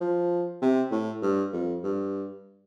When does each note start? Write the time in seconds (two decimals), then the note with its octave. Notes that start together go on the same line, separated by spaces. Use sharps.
0.01 F3
0.62 C3
0.92 A2
1.22 G2
1.53 F2
1.84 G2